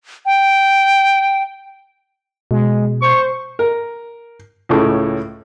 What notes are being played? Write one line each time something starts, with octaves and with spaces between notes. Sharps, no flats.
G5
B2 G#3
C5 C#6
A#4
C#2 A2 C#3